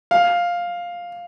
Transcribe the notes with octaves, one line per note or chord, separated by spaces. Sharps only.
F5